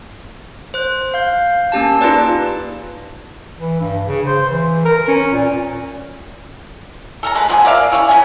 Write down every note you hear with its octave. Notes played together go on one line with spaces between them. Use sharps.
C5 F#6
F5 G6
A#3 C#4 G4 A5
D#4 F4 G#4 B4 D5
E3
G2
C#3
C5
E3
A#4
C#4
A#2
A4 A#4 A5 A#5
G#3 B4
F3 B3 A#4 G#5
A#4 D5 E5 F5
G3 G#3 C#4 E4
C#4 G4 A#4 G#5